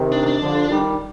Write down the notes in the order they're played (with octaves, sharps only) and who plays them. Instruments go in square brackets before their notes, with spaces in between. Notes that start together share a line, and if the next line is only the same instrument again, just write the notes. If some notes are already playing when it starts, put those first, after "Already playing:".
Already playing: [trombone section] C3 D#3
[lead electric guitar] D4
D4
[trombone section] D3 F3
D#3 G3